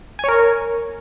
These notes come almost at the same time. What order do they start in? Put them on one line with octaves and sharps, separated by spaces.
G#5 C#5 A#4